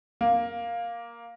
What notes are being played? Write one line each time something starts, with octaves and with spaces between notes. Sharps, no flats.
A#3